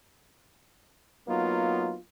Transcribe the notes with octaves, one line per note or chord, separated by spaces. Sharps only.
F#3 A#3 B3 D#4 F4